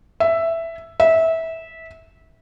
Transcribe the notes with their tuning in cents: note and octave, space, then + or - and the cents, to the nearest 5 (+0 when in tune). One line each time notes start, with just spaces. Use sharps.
E5 +5
E5 -20